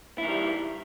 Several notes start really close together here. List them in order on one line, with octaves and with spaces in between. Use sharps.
E4 D#3 G3